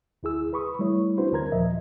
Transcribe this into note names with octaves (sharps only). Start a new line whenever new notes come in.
D2 E4 G#4 E6
B4 B5 C#6 D#6
G3 A3 E4 C#5
C4 D4 E4 F#4 B4 C5
D2 D3 A#4 A#5 G#6
D#2 A#2 F3 D#5 E5